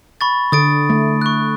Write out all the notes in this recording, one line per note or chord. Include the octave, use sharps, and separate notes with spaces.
B5 C#6 A6
D3 D#6 A6 D7
A3
C#6 F#6